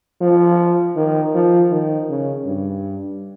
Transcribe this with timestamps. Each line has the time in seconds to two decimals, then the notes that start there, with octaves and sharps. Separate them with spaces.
0.21 F3
0.96 D#3
1.35 F3
1.72 D#3
2.09 C#3
2.46 G2